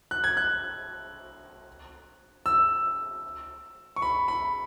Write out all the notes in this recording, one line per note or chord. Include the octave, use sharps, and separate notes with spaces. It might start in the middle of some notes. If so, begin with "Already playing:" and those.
F#6
G#6
F#6
E6
C#6
B5
B5